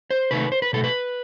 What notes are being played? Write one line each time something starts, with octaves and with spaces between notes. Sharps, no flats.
C5
C3 D#3 A3 B4
C5
B4
B2 A3 A4
B4